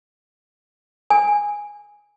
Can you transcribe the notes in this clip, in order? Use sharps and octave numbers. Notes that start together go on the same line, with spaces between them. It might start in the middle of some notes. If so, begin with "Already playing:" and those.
G#5